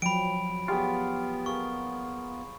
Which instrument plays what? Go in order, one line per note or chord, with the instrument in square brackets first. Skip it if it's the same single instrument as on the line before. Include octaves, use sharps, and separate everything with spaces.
[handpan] F3 F#3 [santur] G5 [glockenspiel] B5 D7
[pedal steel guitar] B3 F4 [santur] G4 G#4 C#5
[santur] A#3 G#4 [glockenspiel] C#6